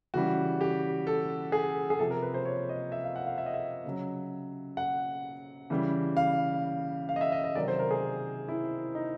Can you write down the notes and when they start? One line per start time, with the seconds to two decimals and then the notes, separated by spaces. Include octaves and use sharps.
0.14 C#3 E3 G3 F#4
0.61 G4
1.07 A4
1.52 G#4
1.90 G#4
1.99 C3 F3 A4
2.11 A#4
2.22 B4
2.34 C5
2.45 C#5
2.69 D#5
2.92 E5
3.04 F5
3.16 F#5
3.27 F5
3.38 E5
3.46 D#5
3.54 E5
3.85 C#3 F#3
4.77 F#5
5.70 C#3 E3 G3
6.17 F5
7.09 F5
7.16 D#5
7.21 E5
7.32 D#5
7.44 D#5
7.55 C3 D#3 F#3 D5
7.68 C5
7.79 A#4
7.91 G#4
8.48 E4
8.95 D#4